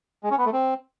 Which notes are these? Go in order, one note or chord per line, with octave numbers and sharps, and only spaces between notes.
G#3
C#4
B3
A3
C4